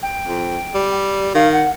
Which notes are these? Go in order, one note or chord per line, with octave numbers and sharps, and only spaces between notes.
G5
F2
G3
D#3 F5
F#5